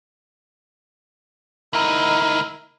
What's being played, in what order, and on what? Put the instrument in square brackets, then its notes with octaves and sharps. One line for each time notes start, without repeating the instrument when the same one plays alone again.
[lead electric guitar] D2 D#4 [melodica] E4 A#4